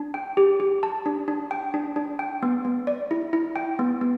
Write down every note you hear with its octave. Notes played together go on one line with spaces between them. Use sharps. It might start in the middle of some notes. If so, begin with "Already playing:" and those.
Already playing: D4
G5
G4
G4
A5
D4
D4
G5
D4
D4
G5
B3
B3
D5
E4
E4
G5
B3
B3